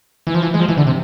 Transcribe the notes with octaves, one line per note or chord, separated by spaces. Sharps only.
E3
F3
E3
G#3
F3
E3
D3
C3